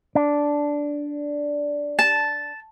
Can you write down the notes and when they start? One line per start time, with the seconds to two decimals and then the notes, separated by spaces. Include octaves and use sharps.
0.15 D4
1.99 A5